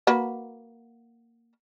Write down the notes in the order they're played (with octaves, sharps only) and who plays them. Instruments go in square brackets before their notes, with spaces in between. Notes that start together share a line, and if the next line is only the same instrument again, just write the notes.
[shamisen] A#3 F#4 B4